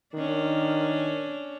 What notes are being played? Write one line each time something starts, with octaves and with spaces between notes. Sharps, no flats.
D#3 C#4 D4